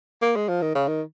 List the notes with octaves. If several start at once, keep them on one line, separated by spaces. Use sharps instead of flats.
A#3
G#3
F3
D#3
C#3
D#3